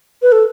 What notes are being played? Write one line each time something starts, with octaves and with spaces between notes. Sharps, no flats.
B4
A4